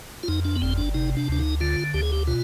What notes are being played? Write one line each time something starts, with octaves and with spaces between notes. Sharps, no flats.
F4
F2 D#4
D4
B3
G1 C4
D4
C3 D#4
D4
D2 D4
D#4
D3 F4
D2 G4
G#4
G4
B2 F4